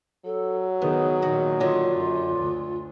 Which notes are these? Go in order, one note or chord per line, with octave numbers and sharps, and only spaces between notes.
F#3 A4
D#3 B3 G#4
A#2 D#3 F#4
D3 F4 C#5 D#5
F#2
D2